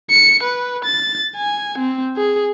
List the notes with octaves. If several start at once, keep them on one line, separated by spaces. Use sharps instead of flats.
C#7
B4
A6
G#5
C4
G#4